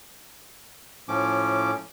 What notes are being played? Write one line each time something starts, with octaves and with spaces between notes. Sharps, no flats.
A2 F3 C#4 D6